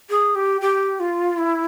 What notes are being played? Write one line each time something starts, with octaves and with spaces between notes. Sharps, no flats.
G#4
G4
G4
F4
E4